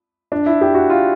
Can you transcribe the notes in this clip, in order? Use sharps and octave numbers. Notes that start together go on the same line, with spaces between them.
D4
E4
G4
F#4
F4